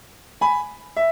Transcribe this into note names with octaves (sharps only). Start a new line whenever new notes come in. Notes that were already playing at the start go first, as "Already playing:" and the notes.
G#5 B5
E5